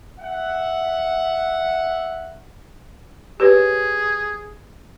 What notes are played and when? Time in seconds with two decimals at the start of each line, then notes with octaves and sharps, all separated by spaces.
0.20 E5 F#5
3.40 G4 G#4 B4 C#5